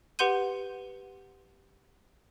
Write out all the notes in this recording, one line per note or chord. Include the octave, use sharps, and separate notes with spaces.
G4 B4 F#5 C6 G6 D#7